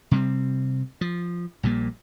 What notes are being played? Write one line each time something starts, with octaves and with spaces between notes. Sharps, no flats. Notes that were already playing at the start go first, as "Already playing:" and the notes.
C3 G3 C4
F3
A#1 A#2 G3 A#3